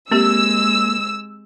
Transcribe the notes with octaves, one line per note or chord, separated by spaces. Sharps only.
G#3 A#3 C4 G4 E6